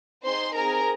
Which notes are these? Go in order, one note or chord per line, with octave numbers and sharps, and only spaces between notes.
C4 D#4 G#4 C5 C6
C4 G#4 A#4 A#5